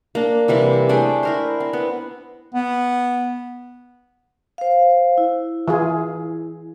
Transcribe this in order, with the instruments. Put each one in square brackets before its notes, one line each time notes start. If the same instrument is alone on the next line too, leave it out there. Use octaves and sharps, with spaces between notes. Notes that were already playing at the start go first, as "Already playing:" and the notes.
[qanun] A#3 D4
C3 E3 G3 E4
A3 D4 G#4 G5
E4 A#4 C5
C4
B3
[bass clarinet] B3
[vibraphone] C5 F5
E4
[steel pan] E3 F4 G#4